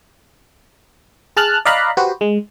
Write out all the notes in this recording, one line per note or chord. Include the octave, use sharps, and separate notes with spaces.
G#4 A5 F6 F#6
D5 D#5 F5 A#5 B5 F#6
F#4 G4 B4 C5
G#3